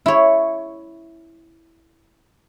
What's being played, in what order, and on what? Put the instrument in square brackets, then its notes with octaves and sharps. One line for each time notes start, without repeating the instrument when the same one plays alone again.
[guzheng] E4 C#5